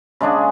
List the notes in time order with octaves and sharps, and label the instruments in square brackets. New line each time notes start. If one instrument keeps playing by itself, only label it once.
[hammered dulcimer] C#3 G#3 D4 G#4